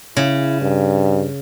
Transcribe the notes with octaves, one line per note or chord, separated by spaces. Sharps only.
C#3 E4
G2